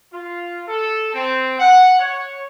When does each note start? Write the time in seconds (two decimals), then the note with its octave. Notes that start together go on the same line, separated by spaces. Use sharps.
0.13 F4
0.68 A4
1.14 C4
1.59 F#5
1.99 C#5